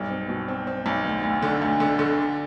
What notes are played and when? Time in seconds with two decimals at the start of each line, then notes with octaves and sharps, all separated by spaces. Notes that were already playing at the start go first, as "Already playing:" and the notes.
Already playing: B1 G2
0.11 C4
0.29 B2
0.48 C4
0.67 C4
0.86 B1
1.05 D2
1.23 D2
1.42 D3
1.62 D2
1.80 D3
1.99 D3
2.18 D4